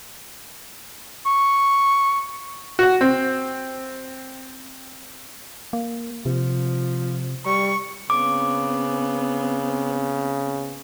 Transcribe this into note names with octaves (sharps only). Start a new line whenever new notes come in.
C#6
F#4 F#5
C4
A#3
C3 F3
G3 C#6
C#3 B3 C4 D6